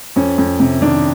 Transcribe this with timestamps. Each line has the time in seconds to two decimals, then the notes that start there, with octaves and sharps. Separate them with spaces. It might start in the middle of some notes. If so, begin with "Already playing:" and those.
0.16 F2 C#4
0.38 F2
0.60 C3
0.82 D#3 D4